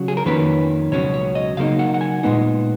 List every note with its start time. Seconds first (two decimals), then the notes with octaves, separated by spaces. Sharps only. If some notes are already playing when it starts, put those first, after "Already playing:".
Already playing: C#3 F#3
0.08 G#4
0.17 A#4
0.25 F2 D#3 A#3 C#4 B4
0.91 C#2 B2 F#3 C#4 C#5
1.14 C#5
1.35 D#5
1.57 C#3 F#3 A#3 D#4 F5
1.79 F#5
1.94 F#5
2.01 G#5
2.23 A#2 G#3 B3 D#4